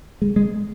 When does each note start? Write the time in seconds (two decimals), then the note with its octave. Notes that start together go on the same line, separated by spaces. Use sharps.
0.22 G#3
0.36 G#3